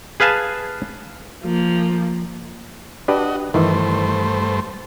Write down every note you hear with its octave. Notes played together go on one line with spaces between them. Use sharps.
G#4 B4 F5 G#5 A5
F3 A#3
D4 F#4 G4 B4 D#5
G2 D#3 E3 A3 C5